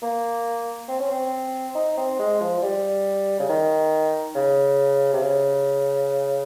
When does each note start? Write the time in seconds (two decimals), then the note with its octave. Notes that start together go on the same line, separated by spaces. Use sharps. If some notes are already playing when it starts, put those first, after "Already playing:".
0.02 A#3
0.88 C4
1.00 C#4
1.11 C4
1.75 D#4
1.97 C4
2.19 G#3
2.40 F3
2.58 F3
2.62 G3
3.40 C#3
3.49 D#3
4.35 C#3
5.13 C3
5.22 C#3